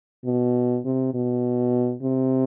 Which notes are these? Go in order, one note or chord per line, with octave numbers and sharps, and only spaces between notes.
B2
C3
B2
C3